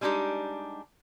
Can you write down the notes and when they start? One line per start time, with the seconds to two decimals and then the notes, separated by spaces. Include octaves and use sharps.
0.01 G3 G#3 D4 D#4 G4